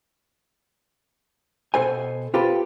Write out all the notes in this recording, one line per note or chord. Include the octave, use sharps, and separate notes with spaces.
B2 A4 C5 G#5
F4 G4 A4 B4 C5